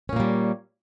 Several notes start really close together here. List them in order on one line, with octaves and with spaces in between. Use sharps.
C#4 A#2 A#3 G3